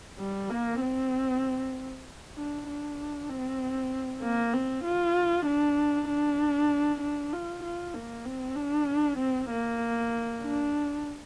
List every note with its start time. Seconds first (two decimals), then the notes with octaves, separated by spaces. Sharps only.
0.19 G3
0.50 A#3
0.81 C4
2.37 D4
2.67 D4
3.30 C4
4.22 A#3
4.54 C4
4.85 F4
5.46 D4
6.08 D4
7.01 D4
7.33 F4
7.64 F4
7.94 A#3
8.25 C4
8.56 D4
9.19 C4
9.50 A#3
10.42 D4